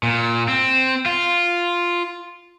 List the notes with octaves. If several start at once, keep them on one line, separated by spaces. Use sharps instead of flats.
A#2
C4
F4